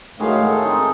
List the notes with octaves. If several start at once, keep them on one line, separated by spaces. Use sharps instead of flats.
A2 D#3 F#3 G#3 A3 F5
A4
C4 D#4 C5